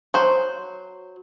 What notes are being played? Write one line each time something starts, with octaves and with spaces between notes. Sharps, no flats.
F#3 C5